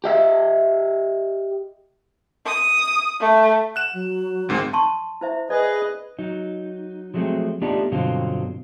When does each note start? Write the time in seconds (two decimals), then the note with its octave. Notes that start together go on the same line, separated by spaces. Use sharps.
0.04 G4 D#5 E5
2.46 D#6
3.20 A3
3.76 F#5 F#6 E7
3.94 F#3
4.49 D2 G#2 D#3 C4
4.73 A5 C6 C#6
5.21 E4 C5 E5
5.50 G#4 B4 D5 D#5
6.19 F#3 D#4
7.14 F3 F#3 G#3 A3 C4
7.62 A3 B3 D4 D#4 F4 G4
7.92 G2 B2 D3 F#3 C4 F4